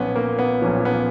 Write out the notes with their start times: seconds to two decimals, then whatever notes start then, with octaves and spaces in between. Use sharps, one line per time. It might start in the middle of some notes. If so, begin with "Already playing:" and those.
Already playing: B1 A#2 F3 B3 C#4
0.16 A#3
0.39 B3
0.62 B1 A#2 F3 C#4
0.85 B3